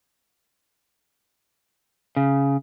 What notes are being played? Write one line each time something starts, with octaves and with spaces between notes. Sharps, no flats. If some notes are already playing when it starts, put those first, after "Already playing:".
C#3